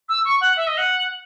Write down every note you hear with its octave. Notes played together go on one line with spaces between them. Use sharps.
E6
C#6
F#5
E5
D#5
F#5